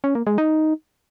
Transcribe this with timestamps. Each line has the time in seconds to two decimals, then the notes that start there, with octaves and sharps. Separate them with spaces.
0.04 C#4
0.15 A#3
0.27 G#3
0.38 D#4